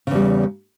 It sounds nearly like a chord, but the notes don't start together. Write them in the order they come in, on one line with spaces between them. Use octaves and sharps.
C#3 E2 G3